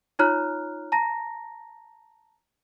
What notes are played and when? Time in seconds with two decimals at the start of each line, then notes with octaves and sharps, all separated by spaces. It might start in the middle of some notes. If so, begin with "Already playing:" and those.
0.19 D#4 F4 C#5 A#5 F6 F#6
0.92 A5 A#5 A#6